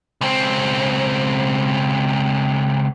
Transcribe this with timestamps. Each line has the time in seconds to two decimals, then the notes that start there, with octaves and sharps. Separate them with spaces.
0.21 C#2 C4